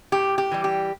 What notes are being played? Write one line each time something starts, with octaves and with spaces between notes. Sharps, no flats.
A2 G4
G4
E3 G3
G4